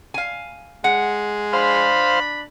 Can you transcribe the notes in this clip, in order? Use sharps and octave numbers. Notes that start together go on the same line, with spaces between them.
F5 G#5
G#3 F#5
D4 C5 F5 B5